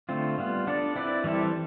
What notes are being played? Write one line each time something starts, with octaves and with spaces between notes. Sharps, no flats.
D3 A3 C4 F4
G3 B3 F4
B3 D4 A4 D5
C4 E4 B4 D5
E3 G3 C4 E4 A4